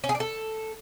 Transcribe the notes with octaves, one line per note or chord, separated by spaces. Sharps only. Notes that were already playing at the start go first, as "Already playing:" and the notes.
C#4
G#4
D4
A4